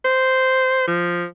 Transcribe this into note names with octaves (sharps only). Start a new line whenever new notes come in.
C5
F3